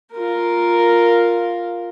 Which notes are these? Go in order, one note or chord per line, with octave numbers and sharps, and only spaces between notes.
F4 A#4